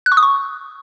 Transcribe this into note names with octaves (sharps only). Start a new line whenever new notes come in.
F#6
C#6
D#6
C#6